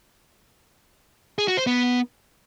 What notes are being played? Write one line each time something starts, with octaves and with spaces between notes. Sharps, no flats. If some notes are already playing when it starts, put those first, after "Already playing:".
G#4
F#4
C5
B3